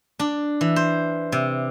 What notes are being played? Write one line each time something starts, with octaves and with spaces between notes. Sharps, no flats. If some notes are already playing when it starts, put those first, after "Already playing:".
D4
E3
C5
C3